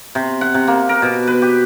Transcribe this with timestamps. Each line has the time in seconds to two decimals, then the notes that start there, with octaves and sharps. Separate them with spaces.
0.15 C3
0.41 F#5
0.54 C3
0.67 A#3
0.89 A#4
1.02 B2
1.27 B4
1.42 G4